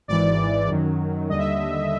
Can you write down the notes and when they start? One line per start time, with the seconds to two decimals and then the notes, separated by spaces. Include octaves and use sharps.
0.08 G#1 G#2 E3 D5
0.69 F#2 D#3 F#3
1.28 D#2 D3 G3 D#5
1.39 E5
1.49 D#5